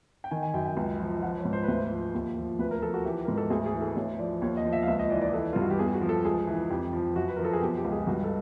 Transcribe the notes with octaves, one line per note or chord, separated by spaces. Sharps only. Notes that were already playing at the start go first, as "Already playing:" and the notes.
G5
D#3 G#5
G#5
F#2 G5
G5
C#2
F3
F3 F#5
C#5
G#2
C5
B4
D2 C5
F3
D#2
F3
D2 B4
A#4
F3 A4
F#4
E3 G4
G#2 A#4
A4
D2 G#4
G#4
E3
A4
D2 C#5
F3 D5
D#2 C#5
D#5
F3
E5
F5
C#2 E5
D#5
E3 D5
D5
E3 A4
G2 F4
F#4
G4
E2 G#4
F#4
F3
A4
C#2 G#4
E3
F2 G4
F3
F#2 F#4
B4
F3 A#4
A4
G#4
B2 G4
G4
C#2
G#4
G2 F#4
A4